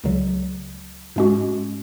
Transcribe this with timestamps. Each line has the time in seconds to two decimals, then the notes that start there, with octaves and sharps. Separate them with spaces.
0.04 C#2 C#3 F#3
1.16 G#2 G#3 C#4 F#4